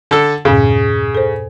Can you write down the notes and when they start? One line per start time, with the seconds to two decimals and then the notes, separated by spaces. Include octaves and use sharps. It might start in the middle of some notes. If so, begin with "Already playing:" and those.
0.11 D3 A4
0.45 E2 G2 A#2 C#3
1.15 A4 C5